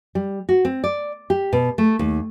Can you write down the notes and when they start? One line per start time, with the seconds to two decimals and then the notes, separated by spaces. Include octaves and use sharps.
0.15 G3
0.49 F#4
0.65 C4
0.84 D5
1.30 G4
1.53 B2
1.78 A3
1.99 D#2